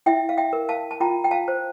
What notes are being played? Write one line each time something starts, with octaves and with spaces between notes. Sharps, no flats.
E4 E5 G5
F5
E5 G5
A#4
F5 A5
A5
F4 G5 A#5
G5
F5 A5
C5